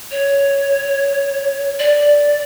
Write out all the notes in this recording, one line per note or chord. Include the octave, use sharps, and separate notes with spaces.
C#5
D5